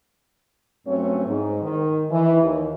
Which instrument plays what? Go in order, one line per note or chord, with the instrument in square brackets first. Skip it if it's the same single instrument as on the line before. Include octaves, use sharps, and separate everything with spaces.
[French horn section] G2 F#3 A3 C4 C#4 C#5
G#2
D#3
E3
D#2